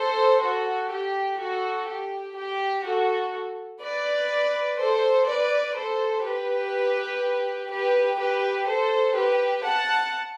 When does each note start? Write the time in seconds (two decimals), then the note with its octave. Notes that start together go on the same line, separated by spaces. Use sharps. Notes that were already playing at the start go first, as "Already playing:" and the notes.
Already playing: A4 C5
0.42 F#4 A4
0.90 G4
1.39 F#4 A4
1.87 G4
2.36 G4
2.85 F#4 A4
3.81 B4 D5
4.79 A4 C5
5.27 B4 D5
5.76 A4 C5
6.24 G4 B4
7.70 G4 B4
8.18 G4 B4
8.67 A4 C5
9.16 G4 B4
9.64 F#5 A5